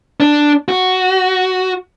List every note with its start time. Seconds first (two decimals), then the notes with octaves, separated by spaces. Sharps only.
0.20 D4
0.69 F#4